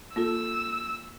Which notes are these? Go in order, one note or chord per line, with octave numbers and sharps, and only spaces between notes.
A#3 F4 A4 E6